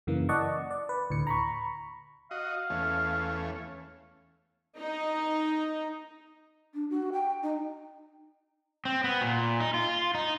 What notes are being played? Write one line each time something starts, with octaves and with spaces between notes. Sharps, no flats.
F#2 C#3 E3 A#3
D5 D#5 F#5 A5 C#6
D5
B4
D2 A2 C#7
A#5 B5 C#6
F#4 D#5 F5
E2 A3 C#4
D#4
D4
F#4
G5
D#4
C4
B3
A#2
D#4
F4
D#4